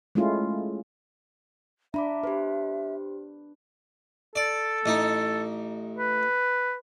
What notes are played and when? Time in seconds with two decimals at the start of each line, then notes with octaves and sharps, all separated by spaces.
0.15 G#3 A3 C#4 E4 F4
1.94 D4 E5 A#5 B5 D6
2.24 G4 B4 C5
4.36 A4 D5
4.86 A1 D#4
5.98 B4